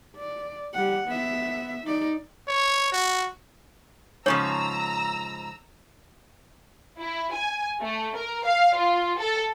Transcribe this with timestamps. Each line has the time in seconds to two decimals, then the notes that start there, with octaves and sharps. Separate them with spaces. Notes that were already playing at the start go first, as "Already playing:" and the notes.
0.16 D5
0.74 G3 F#5
1.08 B3 E5
1.84 D#4 D5
2.48 C#5
2.92 F#4
4.26 G#2 C#3 F3 C#5 A#5 E6
6.98 E4
7.33 G#5
7.81 A3
8.16 A#4
8.45 F5
8.75 F4
9.18 A4